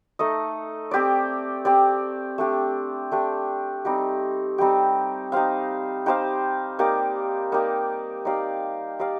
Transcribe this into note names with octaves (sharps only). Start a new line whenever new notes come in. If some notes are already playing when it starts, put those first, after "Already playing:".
A3 D#4 A4 D#5
C4 G4 D5
C4 G4 D5
A3 D4 G4
A3 D4 G4
G3 C4 D#4 G4
G3 C4 D#4 G4
D#4 G4 C5 F5
D#4 G4 C5 F5
A#3 D#4 G4 D5
A#3 D#4 G4 D5
D#4 G4 D5 F5
D#4 G4 D5 F5